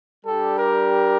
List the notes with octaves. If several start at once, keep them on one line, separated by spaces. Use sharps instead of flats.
G3 D4 G4 A4
A#4